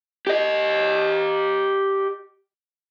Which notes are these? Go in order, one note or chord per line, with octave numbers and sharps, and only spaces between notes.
G4 D#5